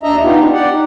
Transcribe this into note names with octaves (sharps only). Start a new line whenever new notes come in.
D#2 D4 D#5 E5 A#5
B3 D#4 F4 G4
D4
G4 D5 F#5
D#4